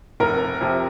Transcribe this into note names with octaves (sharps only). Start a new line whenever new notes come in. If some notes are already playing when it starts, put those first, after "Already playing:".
F1 A#4
F2 C3